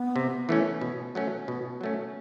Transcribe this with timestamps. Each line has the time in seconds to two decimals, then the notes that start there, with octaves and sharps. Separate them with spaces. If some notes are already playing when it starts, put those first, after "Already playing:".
Already playing: B3
0.16 C3
0.49 E3 A3 C#4
0.81 B2
1.15 F#3 A3 C#4
1.48 B2
1.81 F#3 A3 C#4